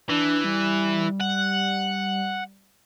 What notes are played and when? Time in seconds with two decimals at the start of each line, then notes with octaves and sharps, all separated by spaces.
0.09 E3 D4
0.44 G3
1.21 F#5